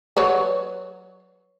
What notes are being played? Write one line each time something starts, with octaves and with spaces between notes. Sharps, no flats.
F#3 B4 C#5